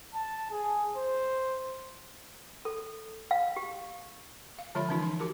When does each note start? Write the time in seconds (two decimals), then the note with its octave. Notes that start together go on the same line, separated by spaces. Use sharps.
0.15 A5
0.52 G#4
0.96 C5
2.65 A4
3.31 F5
3.56 G4
4.59 F5
4.75 D3 F3 G#3 F4 C#5 B5
4.89 D3 E3 C#4 D#4 F4
5.03 C6
5.19 F#4 G4 A#4 A5